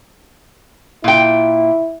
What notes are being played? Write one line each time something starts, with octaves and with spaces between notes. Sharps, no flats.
A#2 E4 G5